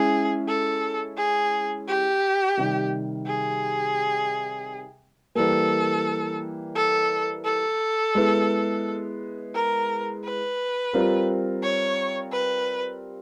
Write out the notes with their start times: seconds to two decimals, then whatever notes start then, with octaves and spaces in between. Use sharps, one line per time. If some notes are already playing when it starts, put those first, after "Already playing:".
Already playing: G#3 C#4 E4 G#4
0.48 A4
1.17 G#4
1.88 G4
2.57 C3 D#3 G3
3.26 G#4
5.35 E3 G3 A#3 A4
6.75 A4
7.45 A4
8.15 G#3 B3 E4
9.54 A#4
10.24 B4
10.93 G3 C4 F4 A#4
11.63 C#5
12.32 B4